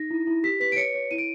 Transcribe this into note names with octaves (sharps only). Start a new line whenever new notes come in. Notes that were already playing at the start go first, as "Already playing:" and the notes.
Already playing: D#4 A#6
E4
E4
G4 B6
B4 B6
D7
C#5 C#7
C#5
E4 D#7
D7